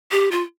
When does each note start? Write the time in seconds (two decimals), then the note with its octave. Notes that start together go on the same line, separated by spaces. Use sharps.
0.12 G4
0.31 F4